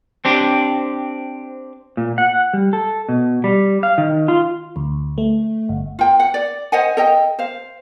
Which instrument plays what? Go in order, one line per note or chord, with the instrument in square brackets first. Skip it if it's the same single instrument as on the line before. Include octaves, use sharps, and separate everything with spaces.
[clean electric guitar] C4 D4 G4
[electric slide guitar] A#2
F#5
G3
A4
B2
G3
F5
D#3
F4
[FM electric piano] D2
A3
G1
[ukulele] F4 G5
F#5
D5
C5 D#5 F#5 G#5
A4 D#5 G5
C5 F5